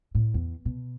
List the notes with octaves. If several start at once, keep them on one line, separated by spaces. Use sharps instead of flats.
A2
E2
B2